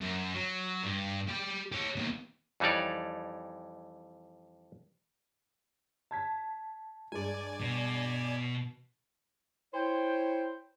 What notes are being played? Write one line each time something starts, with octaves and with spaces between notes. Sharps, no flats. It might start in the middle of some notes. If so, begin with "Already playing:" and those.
F#2
F#3
G2
G4 B5
G4 C#5
D#2 B2
F2 E3 G3 D#4 C#5 D5
A5 G#6 B6
G2 G#3 D5 G#5
B2
E4 C5 C#5 G5